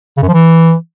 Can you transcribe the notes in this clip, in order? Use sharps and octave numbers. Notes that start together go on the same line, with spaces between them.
C#3
F#2
F3
E3